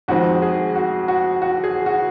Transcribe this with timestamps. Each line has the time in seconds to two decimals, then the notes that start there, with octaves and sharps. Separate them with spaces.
0.08 F2 D#3 G#3 C4 F#4
0.42 G#4
0.75 F#4
1.08 F#4
1.42 F#4
1.64 G#4
1.86 F#4